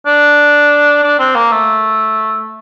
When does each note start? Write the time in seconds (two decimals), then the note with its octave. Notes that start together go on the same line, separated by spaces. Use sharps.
0.06 D4
1.03 D4
1.19 C4
1.35 A#3
1.52 A3